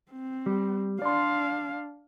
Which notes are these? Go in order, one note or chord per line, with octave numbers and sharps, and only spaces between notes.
C4
G3
D4 D5 F5 C6